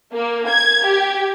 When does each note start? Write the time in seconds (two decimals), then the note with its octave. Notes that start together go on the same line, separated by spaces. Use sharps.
0.13 A#3
0.49 G#6
0.87 G4